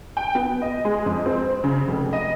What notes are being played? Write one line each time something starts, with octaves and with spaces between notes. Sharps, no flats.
G5
B3
D#5
G#3
F2
C4
C#3
F1
D#5